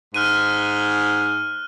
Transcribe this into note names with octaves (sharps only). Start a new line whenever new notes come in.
G#2 F6 F#6 D#7